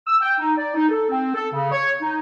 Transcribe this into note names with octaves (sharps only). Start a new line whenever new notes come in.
E6
G5
D#4
D5
D#4
A4
C4
A4
C#3
C#5
D#4